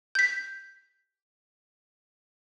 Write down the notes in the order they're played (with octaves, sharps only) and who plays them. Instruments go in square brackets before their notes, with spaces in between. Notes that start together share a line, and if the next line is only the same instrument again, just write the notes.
[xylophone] G6 B6